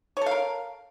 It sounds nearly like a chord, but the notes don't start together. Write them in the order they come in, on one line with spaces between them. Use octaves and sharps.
C#5 A4 F5 A#4